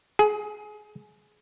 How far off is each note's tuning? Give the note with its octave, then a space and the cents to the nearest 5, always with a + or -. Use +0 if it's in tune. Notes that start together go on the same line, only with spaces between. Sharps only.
G#4 +25